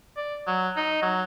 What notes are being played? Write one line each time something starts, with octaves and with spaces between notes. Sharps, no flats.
D5
F#3
D#4
F#3